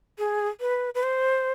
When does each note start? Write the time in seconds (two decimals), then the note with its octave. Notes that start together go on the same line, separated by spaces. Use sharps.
0.19 G#4
0.61 B4
0.95 B4
1.03 C5